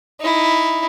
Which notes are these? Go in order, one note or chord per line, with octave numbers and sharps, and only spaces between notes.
D#4 E4